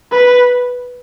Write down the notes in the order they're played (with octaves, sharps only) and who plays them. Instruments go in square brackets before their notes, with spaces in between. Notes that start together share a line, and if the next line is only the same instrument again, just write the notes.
[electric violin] B4